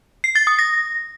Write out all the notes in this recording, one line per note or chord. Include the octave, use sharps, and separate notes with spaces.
C7
A6
D#6
A#6